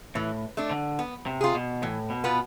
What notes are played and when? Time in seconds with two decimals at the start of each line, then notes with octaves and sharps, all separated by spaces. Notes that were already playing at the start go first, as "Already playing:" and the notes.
0.15 A2 E3
0.57 A3 D4
0.71 D3
0.99 B3
1.26 C3
1.41 F4 G#4
1.55 B2
1.82 A2 E3
2.10 B2
2.24 B3 F4 B4